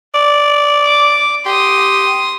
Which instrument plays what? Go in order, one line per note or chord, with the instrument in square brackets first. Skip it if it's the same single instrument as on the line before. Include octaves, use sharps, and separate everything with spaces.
[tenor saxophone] D5
[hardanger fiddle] D6
[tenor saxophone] G4 [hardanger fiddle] C6 D#6